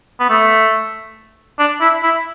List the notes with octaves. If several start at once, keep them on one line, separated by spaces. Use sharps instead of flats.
B3
A3
D4
E4
E4